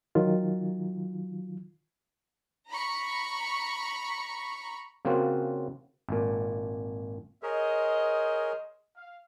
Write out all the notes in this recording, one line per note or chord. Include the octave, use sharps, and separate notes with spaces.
D#3 F#3 F4
A#5 B5 C#6
C#3 A#3 C4 F4 F#4
G#1 A#2
G#4 A#4 C5 C#5 D#5
F5